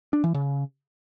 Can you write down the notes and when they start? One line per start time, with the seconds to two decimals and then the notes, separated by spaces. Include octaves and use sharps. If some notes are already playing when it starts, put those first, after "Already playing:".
0.13 D4
0.24 E3
0.34 C#3